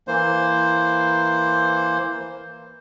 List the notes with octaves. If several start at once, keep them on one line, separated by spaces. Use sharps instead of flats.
E3 A#3 C5